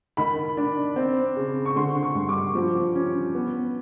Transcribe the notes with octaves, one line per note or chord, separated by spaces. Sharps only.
D#3 B5
D4
C4
C#3
C#6
D3 C6
C#6
G2
D6
F3
C#4
B3